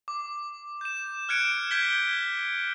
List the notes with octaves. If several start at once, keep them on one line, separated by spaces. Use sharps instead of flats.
D6
G6 E7
F6 F#6 G#6 C#7 D7 E7
G6 G#6 B6 G7